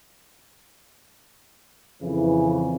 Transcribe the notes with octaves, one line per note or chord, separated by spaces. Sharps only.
F2 C#3 E3